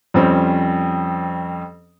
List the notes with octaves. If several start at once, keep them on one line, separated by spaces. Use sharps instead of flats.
F2 G3 C4 C#4 G5